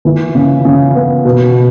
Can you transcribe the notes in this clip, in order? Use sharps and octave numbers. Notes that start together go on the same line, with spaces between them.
E3
C#3
C#3
B3
B2